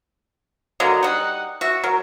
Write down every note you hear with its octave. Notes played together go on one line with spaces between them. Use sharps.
D3 F#3 A#3 D#5
G3 D#4 F#5
F#4 E5
F#3 A#4